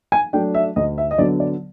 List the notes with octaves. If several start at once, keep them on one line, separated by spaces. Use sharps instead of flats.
G#5
F#3 A3 D4 G5
E5
D2 D#5
E5
D#5
D3 F#3 B3 D5
D5